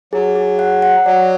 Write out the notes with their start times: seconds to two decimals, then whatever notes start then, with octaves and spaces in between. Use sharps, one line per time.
0.13 F#3 G#4
0.36 G#4
0.59 F#5
0.82 F#5
1.06 F#3 D5